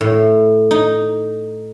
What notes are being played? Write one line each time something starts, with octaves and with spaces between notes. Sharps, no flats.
A2
D#4